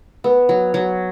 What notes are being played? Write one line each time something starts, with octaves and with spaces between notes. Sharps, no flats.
B3
F#3
F#3